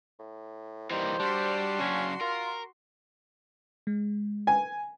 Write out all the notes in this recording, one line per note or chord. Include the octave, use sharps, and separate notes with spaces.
A2
D#3 E3 G3 A#3 C5
G3 D4 F#4 C6
C#3 F#3 C#4
F4 A#4
G#3
G#5